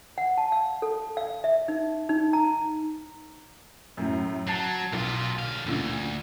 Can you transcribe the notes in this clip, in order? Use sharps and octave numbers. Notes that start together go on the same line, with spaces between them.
F#5
A5
F5
A4
F5
E5
D#4
D#4
A#5
F#2 A2
F#3 A5 A6 C7
B1 A#2 F4
D3 F5
D2 G2 A#2 D3